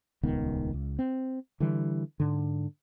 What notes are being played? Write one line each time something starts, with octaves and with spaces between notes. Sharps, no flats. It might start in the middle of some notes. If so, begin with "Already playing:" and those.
D#1 C#2 D#3 B3
C#2
C4
D3 E3 G3
G#2 D3